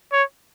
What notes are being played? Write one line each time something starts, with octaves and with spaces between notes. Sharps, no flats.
C#5